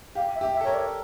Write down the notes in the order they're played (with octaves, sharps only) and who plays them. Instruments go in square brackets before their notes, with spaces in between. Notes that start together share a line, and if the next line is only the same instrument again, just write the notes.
[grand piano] G4 [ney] F5
[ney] E5
[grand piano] G4
[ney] E5
[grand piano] A4
[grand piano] A#4 [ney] C#5
[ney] D5